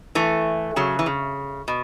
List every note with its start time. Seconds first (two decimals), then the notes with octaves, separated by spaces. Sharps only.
0.15 E3 A3
0.76 C#3 F#3
0.99 E3
1.06 C#3
1.68 B2